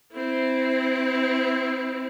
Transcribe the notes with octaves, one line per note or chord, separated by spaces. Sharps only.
C4 E4